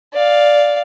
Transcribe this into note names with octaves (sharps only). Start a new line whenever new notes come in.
D5 F5